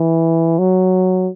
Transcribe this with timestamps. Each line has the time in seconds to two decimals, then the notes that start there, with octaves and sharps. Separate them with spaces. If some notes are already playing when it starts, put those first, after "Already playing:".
Already playing: E3
0.59 F#3